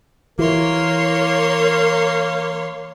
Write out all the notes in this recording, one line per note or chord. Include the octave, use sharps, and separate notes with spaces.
E3 A#3 A#4 C#5 C6